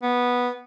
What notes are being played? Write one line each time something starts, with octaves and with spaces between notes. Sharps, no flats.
B3